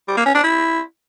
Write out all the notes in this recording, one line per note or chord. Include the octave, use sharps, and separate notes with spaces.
G3
A#3
C#4
D4
E4